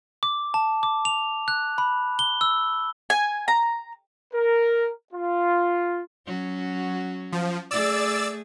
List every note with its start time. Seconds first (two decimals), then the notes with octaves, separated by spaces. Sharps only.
0.23 D6
0.54 A5
0.83 D6
1.05 F7
1.48 F#6
1.78 B5
2.19 G7
2.41 E6
3.10 G#5
3.48 A#5
4.33 A#4
5.13 F4
6.26 F#3 C#4 F#4
7.32 F3
7.71 A3 G#4 D5 E6 A6